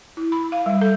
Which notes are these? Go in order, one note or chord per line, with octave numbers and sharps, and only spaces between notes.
E4
B5
F5
G3
A4